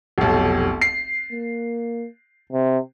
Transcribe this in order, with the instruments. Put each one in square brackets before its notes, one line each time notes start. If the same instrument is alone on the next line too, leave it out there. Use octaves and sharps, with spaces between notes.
[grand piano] F1 B1
C7
[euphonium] A#3
C3